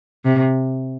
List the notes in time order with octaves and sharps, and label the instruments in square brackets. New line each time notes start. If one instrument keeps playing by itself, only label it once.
[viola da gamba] C3